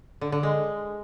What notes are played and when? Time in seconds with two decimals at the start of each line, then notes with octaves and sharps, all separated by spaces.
0.21 D3
0.32 D3
0.43 G#3